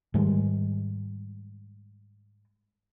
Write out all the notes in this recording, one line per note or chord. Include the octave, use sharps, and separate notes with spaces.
G#2 D#3 G3 G#3